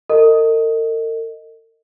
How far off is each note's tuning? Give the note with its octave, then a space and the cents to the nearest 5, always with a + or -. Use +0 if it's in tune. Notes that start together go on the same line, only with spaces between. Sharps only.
A#4 -45 D#5 +0